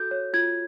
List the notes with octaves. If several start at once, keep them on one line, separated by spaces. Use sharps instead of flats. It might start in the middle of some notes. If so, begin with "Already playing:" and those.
Already playing: F#4 A4 G6
C#5
F4 G#6